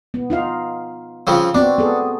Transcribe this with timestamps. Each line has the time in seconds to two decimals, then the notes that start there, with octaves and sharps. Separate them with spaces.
0.14 B3
0.30 D#4 F4 F5
1.27 C#3 F3 C4
1.55 B3 C4 D4 F#4
1.79 B3 G#4 A4